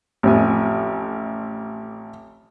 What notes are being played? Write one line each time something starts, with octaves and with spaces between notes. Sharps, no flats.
A1 F2 G#5